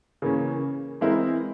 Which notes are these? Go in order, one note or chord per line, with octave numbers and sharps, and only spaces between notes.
C#3 E3 A#3 C#4
E3 G#3 C4 E4 A#4